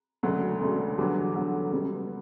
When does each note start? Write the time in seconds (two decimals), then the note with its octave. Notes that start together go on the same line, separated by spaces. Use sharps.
0.23 E1 D2 C#3 F#3
0.60 E1 D2 C#3
0.98 E2 D3 F#3 G3
1.36 E2 D3 F#3
1.72 C#2 C#3 F#3 G3 B3